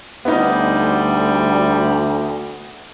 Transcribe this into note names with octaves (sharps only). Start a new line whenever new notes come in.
D2 G3 B3 D#4